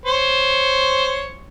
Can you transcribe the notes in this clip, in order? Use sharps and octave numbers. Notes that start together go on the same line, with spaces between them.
C5 C#5